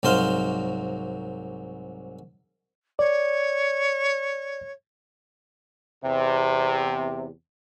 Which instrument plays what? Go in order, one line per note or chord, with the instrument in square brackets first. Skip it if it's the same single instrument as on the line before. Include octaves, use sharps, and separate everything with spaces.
[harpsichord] C2 G#2 F#3 C5 F5 C6
[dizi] C#5 [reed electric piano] D5
[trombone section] E2 C3